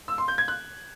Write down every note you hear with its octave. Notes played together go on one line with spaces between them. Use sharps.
E6
C6
G6
G#6
F#6